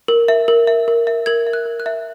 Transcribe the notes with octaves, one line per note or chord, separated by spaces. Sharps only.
A#4
E5
A#4
E5
A#4
E5
A#4 G#6
E5
F#6
A#4
F#6
E5